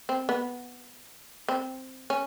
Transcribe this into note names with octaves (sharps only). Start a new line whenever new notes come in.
C4
B3
C4
C#4